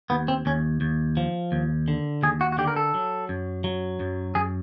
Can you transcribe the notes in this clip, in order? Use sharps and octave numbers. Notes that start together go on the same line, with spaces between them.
D#2 B3
C4
D#2 C#4
D#2
F3
D#2
D3
D#2 G#4
F#4
F#4
D3 G4
A#4
A4
F#3
F#2
F#3
F#2
F#2 G#4